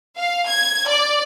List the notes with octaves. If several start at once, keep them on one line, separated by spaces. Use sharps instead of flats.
F5
G#6
D5